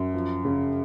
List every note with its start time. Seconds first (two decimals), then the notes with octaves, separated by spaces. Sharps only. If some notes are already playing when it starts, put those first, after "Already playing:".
Already playing: F#2
0.14 F3
0.45 C#3